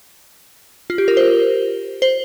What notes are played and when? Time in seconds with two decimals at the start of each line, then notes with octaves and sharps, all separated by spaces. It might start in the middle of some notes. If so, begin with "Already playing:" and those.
0.90 F4
0.98 G4
1.08 A#4
1.17 C5
2.02 C5